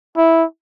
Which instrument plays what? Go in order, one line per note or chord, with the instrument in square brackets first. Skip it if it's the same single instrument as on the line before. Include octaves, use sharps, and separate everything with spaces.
[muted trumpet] E4